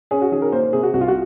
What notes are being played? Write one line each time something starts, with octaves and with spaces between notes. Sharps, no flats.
C#4 G#4
F#4
D#3 G#4
A#4
A#3 C5
C5
C3 G#4
F#4
C2 F#4
F4
F#4